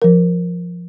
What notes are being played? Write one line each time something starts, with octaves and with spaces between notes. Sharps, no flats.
F3 A#4